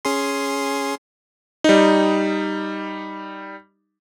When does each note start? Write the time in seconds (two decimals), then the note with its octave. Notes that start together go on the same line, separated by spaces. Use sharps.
0.05 C#4 G#4 C6
1.64 G3 D#4